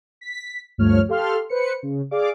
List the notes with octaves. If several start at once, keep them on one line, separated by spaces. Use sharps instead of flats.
B6
D2 G2 F3 A3 C#5 F6
G4 A4 F5 C6 F6
B4 C5 C#7
C#3
G#4 D5 F5 D6